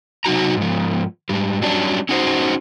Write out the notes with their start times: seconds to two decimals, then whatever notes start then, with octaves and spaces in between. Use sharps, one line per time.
0.25 C3 F#3 D#4 F#4 A#5
0.57 G#2 F3
1.29 G#2 G3
1.62 F#3 G3 C#4 D4
2.09 C#4 D#4 F#4 G#4 C5